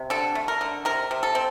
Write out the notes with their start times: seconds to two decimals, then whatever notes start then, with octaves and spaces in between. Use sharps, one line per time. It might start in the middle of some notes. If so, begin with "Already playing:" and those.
Already playing: C3
0.10 D3 A4
0.35 A3
0.48 A#4
0.61 D3
0.85 C3 A#4
1.11 C3
1.23 A4
1.35 C4